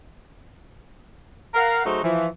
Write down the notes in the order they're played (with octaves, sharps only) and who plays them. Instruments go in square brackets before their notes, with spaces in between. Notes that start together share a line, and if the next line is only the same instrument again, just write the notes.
[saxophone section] A#4 F5 F#5
F#3 A3 D#4 F#4 G#4 C5
E3 F3